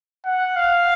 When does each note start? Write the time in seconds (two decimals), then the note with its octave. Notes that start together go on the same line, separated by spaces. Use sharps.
0.25 F#5
0.56 F5